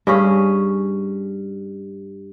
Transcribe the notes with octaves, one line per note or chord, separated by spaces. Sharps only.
G2 C#4 G#4